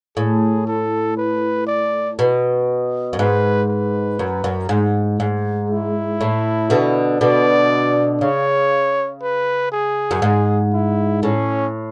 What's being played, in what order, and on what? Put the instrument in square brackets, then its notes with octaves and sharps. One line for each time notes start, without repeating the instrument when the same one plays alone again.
[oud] A2 [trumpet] G#4
[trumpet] A4
B4
D5
[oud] B2
F#2
[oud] G#2 [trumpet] B4
[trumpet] B4
[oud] F#2
F#2
G#2
G#2
[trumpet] E4
[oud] A2
B2 D3
[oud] B2 D3 [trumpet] D5
[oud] C#3 [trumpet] C#5
[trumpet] B4
G#4
[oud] F#2
G#2
[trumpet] E4
[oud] A2 [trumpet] C#4